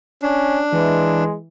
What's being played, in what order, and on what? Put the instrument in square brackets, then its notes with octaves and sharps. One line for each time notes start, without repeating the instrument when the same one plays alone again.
[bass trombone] C#4 [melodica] D4
[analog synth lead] E3 [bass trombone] G#3